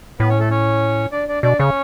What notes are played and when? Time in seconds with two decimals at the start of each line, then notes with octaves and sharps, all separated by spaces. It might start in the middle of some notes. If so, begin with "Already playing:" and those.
0.19 A2 B3 B4
0.29 C#4 C#5
0.39 A3 A4
0.50 C#4 C#5
1.12 D4 D5
1.28 D4 D5
1.43 B2 D4 D5
1.59 C#3 C#4 C#5